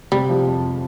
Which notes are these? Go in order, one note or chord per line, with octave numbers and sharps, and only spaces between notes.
C3 G3
F3
F2